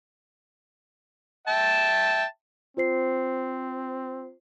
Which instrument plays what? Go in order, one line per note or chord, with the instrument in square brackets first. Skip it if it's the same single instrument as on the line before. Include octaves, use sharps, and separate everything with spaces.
[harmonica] E5 G5 A5
[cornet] C4 [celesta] F4 C5 C7